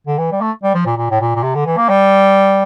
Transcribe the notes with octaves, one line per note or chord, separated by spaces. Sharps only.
D3
E3
G3
A3
G3
F3
A#2
A#2
A2
A#2
A#2
C3
D3
E3
A#3
G3